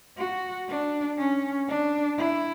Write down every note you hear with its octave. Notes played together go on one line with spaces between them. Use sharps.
F#4
D4
C#4
D4
E4